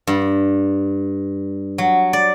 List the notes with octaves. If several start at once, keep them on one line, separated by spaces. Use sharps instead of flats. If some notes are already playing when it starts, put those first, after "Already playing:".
G2
F#3
D5